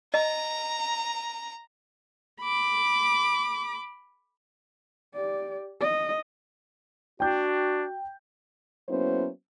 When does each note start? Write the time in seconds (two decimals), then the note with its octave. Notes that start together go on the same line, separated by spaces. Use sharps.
0.14 D#5 A#5
2.42 B5 D6
5.14 G4 D5
5.80 D#5
7.20 D4 F#4 G5 G6
8.89 F#3 A#3 B3 C#4 E4 C5